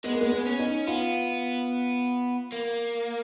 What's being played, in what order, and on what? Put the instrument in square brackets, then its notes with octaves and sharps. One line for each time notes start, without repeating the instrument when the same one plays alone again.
[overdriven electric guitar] G#3 [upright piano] B3
[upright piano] A#3
B3
B3
[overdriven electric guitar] C#4
[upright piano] D#4
[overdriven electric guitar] B3 [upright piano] F4
[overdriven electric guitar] A#3